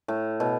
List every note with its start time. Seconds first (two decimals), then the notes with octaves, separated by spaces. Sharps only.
0.08 A2
0.40 B2